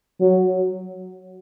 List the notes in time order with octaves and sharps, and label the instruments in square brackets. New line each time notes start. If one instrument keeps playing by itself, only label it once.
[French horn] F#3